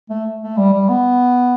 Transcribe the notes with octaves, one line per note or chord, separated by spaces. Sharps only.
A3
A3
G3
G3
B3